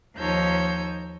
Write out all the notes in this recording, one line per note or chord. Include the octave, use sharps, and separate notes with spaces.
D#2 F3 D#4 C#5 E6 G6